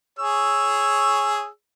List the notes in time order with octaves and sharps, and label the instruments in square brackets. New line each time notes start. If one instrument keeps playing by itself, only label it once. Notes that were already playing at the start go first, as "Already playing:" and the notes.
[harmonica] G#4 C#5 E6